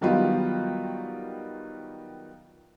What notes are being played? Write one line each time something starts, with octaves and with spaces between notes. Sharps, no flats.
D#3 F#3 G3 B3 D#4 F4